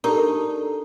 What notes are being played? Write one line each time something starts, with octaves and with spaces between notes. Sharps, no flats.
D4 D#4 G4 A4 A#4